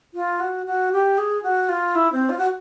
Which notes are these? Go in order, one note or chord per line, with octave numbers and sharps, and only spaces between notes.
F4
F#4
F#4
G4
G#4
F#4
F4
E4
C4
F4
F#4